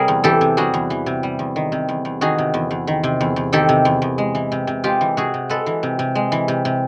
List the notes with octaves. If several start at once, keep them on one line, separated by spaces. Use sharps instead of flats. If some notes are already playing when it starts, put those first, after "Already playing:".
Already playing: C3 G3 G#4 A#4
E2
E3 G4 A4
C3
G3 F#4 G#4
E2
E3
C3
G3
E2
D#3
C3
E2
E2
D#3 F#4 G#4
C3
E2
E2
D#3
C3
E2
E2
D#3 G4 A4
C3
E2
E2
G#3
E3
C3
C3
G#3 F4 G4
E3
C3 F#4 G#4
C3
G#3 A4 B4
E3
C3
C3
G#3
E3
C3
C3